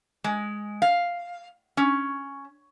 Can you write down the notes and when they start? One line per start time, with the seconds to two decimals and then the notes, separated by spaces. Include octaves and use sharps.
0.24 G#3
0.82 F5
1.77 C#4